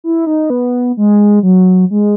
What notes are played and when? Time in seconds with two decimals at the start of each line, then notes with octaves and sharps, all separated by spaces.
0.04 E4
0.27 D#4
0.50 B3
0.97 G#3
1.43 F#3
1.91 G#3